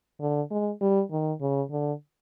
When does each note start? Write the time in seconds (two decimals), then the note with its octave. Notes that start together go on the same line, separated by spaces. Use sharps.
0.20 D3
0.51 G#3
0.81 G3
1.11 D#3
1.41 C#3
1.71 D3